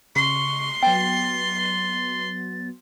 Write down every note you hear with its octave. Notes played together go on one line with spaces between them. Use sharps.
C#3 C6 C#6
F#3 B3 G5 A6